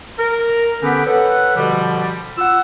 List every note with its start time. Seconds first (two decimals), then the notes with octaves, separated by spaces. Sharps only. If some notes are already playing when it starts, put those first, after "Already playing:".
0.19 A#4
0.82 D3 B3 C#4 G4 B4
1.05 A4 B4 C#5 F#5
1.56 B2 D3 F3 G3
2.38 F4 F#5 E6